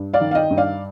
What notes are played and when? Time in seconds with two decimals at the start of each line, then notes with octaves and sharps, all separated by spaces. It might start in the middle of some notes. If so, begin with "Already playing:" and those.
Already playing: G2
0.13 D5 F5
0.21 D#3
0.31 F5
0.35 D#5 G5
0.51 G2
0.57 D5 F5